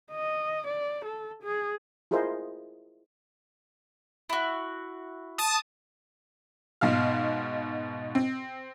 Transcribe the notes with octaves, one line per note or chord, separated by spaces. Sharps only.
D#5
D5
A4
G#4
E4 F4 G#4 A#4 C5 D#5
E4 F#4
A5 D#6
G#2 B2 F5 F6
C4